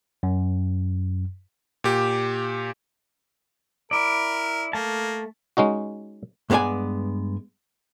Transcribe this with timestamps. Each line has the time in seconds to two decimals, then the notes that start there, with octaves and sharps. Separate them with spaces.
0.23 F#2
1.84 A#2 G4
3.91 E4 A#4 D5
4.73 A3 A#3 A5
5.57 G#3 C#4 D#4 F#4
6.50 G2 G#3 B3 F#4 D5 G#5